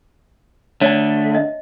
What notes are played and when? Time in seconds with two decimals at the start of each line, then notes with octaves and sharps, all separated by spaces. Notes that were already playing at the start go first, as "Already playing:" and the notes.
0.81 D3 A3 C#5 D5 A5
1.35 D#5 E5